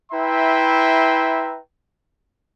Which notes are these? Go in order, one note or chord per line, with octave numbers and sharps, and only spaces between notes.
E4 B4 E5 G5 A#5 C6